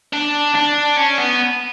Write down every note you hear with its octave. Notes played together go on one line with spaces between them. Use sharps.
D4
D4
C#4
B3